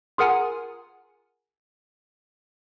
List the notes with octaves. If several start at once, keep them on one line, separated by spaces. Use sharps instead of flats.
F4 G#4 A#4 F#5 G#5 A#5